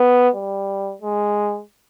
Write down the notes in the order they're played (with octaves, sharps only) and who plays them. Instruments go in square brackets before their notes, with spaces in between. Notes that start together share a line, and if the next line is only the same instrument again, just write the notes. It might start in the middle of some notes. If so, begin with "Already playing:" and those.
Already playing: [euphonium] B3
G3
G#3